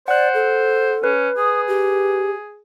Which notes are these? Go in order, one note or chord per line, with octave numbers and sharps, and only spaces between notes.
C5 D5 F#5 F#6
A4
C#4 B4
G#4 D#6
G4